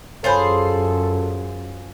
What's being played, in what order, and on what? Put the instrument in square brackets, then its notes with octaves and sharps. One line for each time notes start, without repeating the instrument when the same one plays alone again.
[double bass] F#2 [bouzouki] F4 G#4 C5 [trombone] A4 [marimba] C#5 G#5 B5